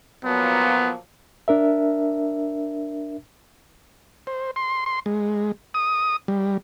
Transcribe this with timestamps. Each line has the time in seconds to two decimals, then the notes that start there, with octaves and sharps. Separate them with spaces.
0.24 A#2 F3 F#3 B3
1.48 D4 A#4 E5
4.27 C5
4.56 C6
4.86 C6
5.06 G#3
5.74 D#6
6.28 G3